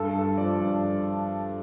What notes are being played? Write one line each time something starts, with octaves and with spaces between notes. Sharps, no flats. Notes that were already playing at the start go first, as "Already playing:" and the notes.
Already playing: G2 A4
G2
F3 D5
G2